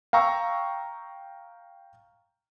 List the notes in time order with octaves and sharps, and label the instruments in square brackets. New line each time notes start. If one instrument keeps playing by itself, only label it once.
[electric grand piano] F5 G5 A#5 C#6 E6